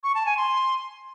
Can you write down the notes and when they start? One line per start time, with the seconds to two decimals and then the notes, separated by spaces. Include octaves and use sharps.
0.04 C#6
0.15 A5
0.26 G#5
0.37 C6